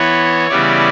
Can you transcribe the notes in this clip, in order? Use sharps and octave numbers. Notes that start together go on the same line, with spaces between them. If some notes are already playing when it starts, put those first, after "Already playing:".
Already playing: E3 B3 E4 C#5
C#3 E3 G3 B3 E4 D5